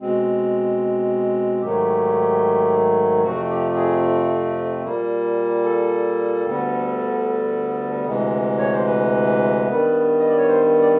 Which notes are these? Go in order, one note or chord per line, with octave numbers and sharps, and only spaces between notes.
B2 G#3 C4
G#2 D#3 F#3 A3 G4
F2 C3 F3 A3 C4 F#4
G4
G#4
A#2 G3 A#3
A4
D2 D3 G3 B3
D2 C3 E3 G#3
C#5
C5
B4
G2 D#3 G3 B3
D#5
D5
C#5
C5
D5